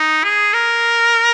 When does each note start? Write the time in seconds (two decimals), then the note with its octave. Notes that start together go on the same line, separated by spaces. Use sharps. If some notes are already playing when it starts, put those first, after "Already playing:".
Already playing: D#4
0.24 G#4
0.53 A#4